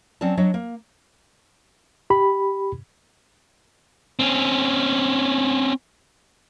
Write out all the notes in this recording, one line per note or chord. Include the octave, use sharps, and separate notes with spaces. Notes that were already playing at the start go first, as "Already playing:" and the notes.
F#3 C4 C#4 D5 A5
F#3 D4 C#5 D#5
A#3
G4 B5
C4 C#4